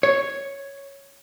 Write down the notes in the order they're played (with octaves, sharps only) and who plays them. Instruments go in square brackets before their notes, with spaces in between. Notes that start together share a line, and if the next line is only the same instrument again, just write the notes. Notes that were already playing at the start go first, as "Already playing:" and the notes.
[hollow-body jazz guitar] C#5